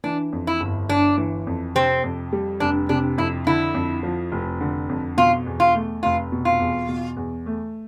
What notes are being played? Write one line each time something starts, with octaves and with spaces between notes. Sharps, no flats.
E3 D4
F2
E4
G1
G1 D4
E3
F2
C3 C4
F2
G3
F1 D4
C3 D4
F2 E4
D3 E4
F2
F3
F1
D3
F2
B2 F4
E2
F4
A3
F1 F4
B2
F4
E2
B2
E2
A3